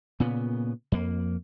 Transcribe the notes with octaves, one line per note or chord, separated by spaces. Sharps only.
A#2 C#3 B3
F2 A#3